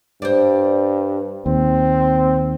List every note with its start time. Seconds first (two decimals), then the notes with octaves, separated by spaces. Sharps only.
0.22 G2 C5 D5
1.46 D#2 C4